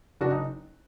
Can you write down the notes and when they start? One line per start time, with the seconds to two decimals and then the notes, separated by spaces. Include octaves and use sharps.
0.21 F#1 D4 F#4
0.31 D#4